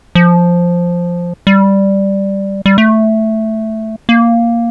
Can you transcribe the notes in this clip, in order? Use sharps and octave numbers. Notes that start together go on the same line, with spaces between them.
F3
G3
G3
A3
A#3